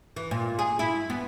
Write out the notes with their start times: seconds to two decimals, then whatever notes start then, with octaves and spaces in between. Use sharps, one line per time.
0.16 E3
0.31 A#2
0.59 G#4
0.79 E4
1.10 B3